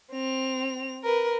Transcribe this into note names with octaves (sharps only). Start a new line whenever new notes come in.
C4 F7
A#4 B4